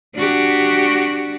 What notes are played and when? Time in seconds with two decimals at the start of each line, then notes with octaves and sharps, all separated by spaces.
0.16 D4 F#4 G4